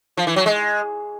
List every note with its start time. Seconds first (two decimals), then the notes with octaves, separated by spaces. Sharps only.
0.17 F3
0.27 E3
0.36 F#3
0.46 G#3